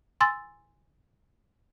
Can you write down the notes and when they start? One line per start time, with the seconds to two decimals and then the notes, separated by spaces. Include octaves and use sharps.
0.21 G#5 C6 E6 A6